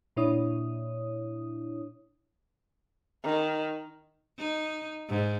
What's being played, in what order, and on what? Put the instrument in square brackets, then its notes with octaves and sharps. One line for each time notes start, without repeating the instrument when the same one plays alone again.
[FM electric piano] A#2 D4 E4 C#5 D#6
[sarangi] D#3
[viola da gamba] D#4
G#2